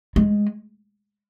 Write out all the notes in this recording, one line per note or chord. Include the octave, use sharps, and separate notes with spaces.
G#3